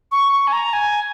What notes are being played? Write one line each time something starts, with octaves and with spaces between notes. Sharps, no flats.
C#6
C#6
G#5
A#5
G#5